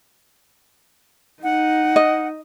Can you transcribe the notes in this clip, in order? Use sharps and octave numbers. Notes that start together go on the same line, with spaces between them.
D#4 F#5
D#5